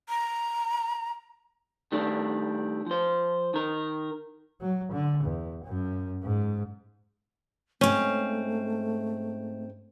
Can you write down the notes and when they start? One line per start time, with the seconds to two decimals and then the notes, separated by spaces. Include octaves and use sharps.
0.09 A#5
1.92 D#3 G3 A3 D4
2.86 F3 C5
3.54 D#3 A#4
4.61 F#3
4.92 D3
5.24 E2
5.65 F#2
6.23 G#2
7.81 G#2 A3 C4 C#4